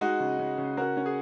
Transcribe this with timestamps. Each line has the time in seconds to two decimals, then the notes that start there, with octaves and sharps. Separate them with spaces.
0.01 G#3 D#4 F#4
0.20 C#3
0.39 C#3
0.58 C#3
0.77 C#4 F#4 A#4
0.97 C#4
1.06 G#4